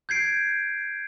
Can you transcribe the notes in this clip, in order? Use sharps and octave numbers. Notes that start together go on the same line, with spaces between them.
G6 G#6 C7 D7